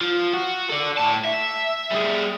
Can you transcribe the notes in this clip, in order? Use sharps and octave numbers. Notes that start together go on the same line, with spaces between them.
F3
F#4
A4 D5
A2 A5
E5
G3 G#4